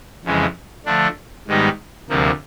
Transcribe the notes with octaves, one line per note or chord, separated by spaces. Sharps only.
F2 C#3 E3 G#3
D3 F3 A3 D4
G#2 D#3 G3 B3 D#4
D2 C3 F3 A#3